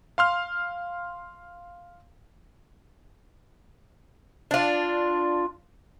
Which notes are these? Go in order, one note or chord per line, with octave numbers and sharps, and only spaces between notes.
F5 C6 F6
D4 F4